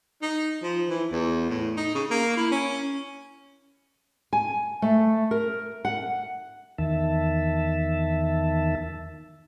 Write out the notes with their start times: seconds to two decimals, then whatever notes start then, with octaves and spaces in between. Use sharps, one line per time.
0.22 D#4
0.62 F3
0.89 E3
1.12 E2
1.49 A2
1.77 D#4
1.95 C#3
2.10 A#3
2.37 E4
2.51 C#4
4.33 G#5
4.82 A3
5.31 A#4
5.85 F#5
6.78 E2 D#3 E5 A5